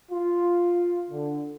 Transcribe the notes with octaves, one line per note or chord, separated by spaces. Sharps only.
F4
D3